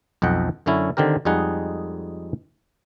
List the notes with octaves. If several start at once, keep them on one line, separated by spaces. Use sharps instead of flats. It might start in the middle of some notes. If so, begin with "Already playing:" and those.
B1 F2 D#5 F#5 G5
F#2 D3 F#3 C#4 E4
D3 D#3 C4 G4 A#4
F2 G3 G#3 D#4 G#4 F#5